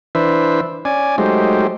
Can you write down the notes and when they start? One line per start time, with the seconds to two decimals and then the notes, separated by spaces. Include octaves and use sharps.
0.15 E3 D4 B4 C5 E5
0.85 C#4 D5 G#5
1.18 F#3 G#3 A3 D#4 G4 C5